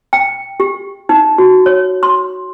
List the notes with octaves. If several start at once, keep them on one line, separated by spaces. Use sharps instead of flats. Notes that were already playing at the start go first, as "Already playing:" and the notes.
G5
G4
D#4
F#4
C#5
C6